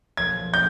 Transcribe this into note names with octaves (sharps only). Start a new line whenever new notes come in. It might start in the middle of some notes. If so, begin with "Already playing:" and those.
B1 A#2 F3 G#6
G6